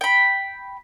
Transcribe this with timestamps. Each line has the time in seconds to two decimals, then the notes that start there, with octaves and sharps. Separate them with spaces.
0.01 G5 B5